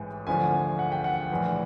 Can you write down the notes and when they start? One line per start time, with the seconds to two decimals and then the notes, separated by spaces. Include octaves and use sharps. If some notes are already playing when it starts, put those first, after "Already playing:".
Already playing: A1 G#2 E3
0.27 D2 D3 F3 G#5
0.79 F#5
0.92 G5
1.04 F#5
1.31 A#1 A2 E3